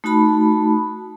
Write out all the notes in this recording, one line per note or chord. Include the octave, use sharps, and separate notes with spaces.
A3 D#4 F#4 A5 B5